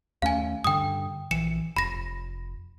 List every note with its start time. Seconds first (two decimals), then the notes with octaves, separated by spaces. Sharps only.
0.22 D#2 A3 C#4 F5 G#5
0.64 G2 D3 G5 D#6
1.31 A#1 E3 C#7 E7
1.76 F1 B5 A#6